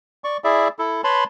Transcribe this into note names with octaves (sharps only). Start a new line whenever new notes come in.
D5 C#6
E4 G#4 D5 E5
E4 A4
B4 C#5 A5 B5 C6